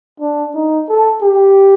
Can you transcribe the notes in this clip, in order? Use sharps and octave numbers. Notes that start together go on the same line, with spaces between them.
D4
D#4
A4
G4